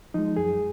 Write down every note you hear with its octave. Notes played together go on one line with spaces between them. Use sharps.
F3 G#3 D#4
F#2 G#4